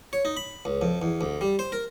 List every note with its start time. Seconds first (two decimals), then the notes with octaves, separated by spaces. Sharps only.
0.13 C#5
0.25 D#4
0.37 B5
0.65 C#2
0.82 F2
1.02 E2
1.21 D2
1.41 G3
1.59 C5
1.72 A#4